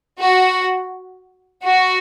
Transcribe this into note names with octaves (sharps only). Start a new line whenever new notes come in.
F#4
F#4